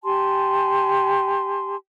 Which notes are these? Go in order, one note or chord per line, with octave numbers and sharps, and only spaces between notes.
G4 G#5 A5 C6